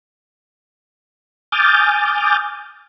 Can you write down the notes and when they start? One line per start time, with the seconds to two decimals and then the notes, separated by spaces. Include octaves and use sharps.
1.52 G#5 D6 D#6 F6 G6 A6